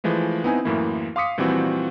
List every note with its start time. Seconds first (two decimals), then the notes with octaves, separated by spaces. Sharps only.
0.04 E3 F3 G#3 A3
0.44 B3 C4 D#4 E4 G#5
0.65 F#2 A2 E3 A#3 E4
1.16 F5 C6 D6 D#6 B6 C#7
1.38 A#2 E3 F3 G3 C4 F#4